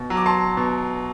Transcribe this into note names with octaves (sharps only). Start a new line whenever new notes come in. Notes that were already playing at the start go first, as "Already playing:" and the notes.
Already playing: B2
F#3
D6
A5 C6
B2